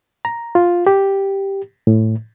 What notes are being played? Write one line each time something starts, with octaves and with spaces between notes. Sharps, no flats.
A#5
F4
G4
A2